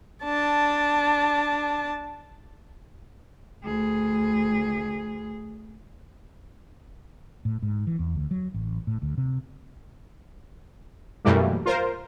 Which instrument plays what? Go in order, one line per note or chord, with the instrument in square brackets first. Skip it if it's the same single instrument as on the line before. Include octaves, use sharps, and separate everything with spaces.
[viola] D4 A5
[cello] D2 G#4
[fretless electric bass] A2
G#2
E3
E2
D2
F#3
A1
A2
D2
C3
[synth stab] F#2 B2 E3 G3 A3 A#3
F4 A#4 C5